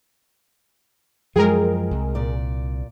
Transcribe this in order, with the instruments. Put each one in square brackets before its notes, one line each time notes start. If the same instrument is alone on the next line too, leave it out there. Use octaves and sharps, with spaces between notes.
[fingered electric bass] F#2 F3 [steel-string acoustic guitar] G#3 G5 [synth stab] G#4 A#4
[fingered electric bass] C2
[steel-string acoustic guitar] A#2 D5